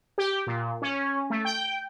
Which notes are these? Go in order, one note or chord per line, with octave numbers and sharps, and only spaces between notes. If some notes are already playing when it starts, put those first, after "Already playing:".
G4
A#2
C#4
A3
G5